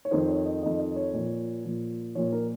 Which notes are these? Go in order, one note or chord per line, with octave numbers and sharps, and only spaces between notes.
C#5
F2 D#3 C5
C#5
D#5
F2 D#3 D#5
D#5
C#5
A#2 F3
A#2 F3
A#2 F3 C#5
A#4